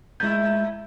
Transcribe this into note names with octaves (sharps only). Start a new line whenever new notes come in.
A2 G#3 E4 G6